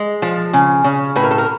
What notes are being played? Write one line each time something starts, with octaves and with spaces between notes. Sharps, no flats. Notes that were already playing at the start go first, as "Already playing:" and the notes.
Already playing: G#3
F3
C#3
C#3
A2 B4
A#4
A4
A#4